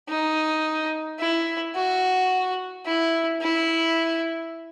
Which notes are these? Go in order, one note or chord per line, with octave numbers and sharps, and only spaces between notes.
D#4
E4
F#4
E4
E4